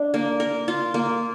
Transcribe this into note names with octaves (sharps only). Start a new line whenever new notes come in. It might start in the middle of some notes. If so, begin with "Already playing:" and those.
Already playing: D4
A#3
A#4
F4
A#3